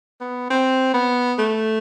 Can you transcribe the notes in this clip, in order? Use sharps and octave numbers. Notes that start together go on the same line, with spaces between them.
B3
C4
B3
A3